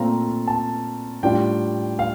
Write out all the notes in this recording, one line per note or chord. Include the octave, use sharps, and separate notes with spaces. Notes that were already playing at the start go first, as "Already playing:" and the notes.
Already playing: A#2 A3 C4 F4 A#5
A5
A2 G3 D4 F4 G5
F5